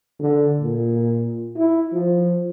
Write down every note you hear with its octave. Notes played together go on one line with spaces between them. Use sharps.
D3
A#2
E4
F3